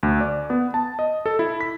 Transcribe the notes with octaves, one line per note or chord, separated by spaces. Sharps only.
D2
D5
B3
A5
D#5
A4
E4
B6